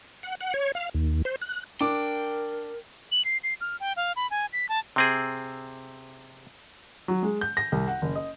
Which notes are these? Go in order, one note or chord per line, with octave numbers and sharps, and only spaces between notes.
F#5
F#5
C#5
F5
D#2
C5
F#6
D4 A#4 G5 D6
F#7
C7
C7
F6
G5
F5
B5
G#5
B6
A5
C3 C4 G#4
F#3
G#3
G6
A#6
C2
F#5
F#1
D#5